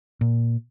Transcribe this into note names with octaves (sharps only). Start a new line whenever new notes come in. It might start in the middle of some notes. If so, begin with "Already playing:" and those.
A#2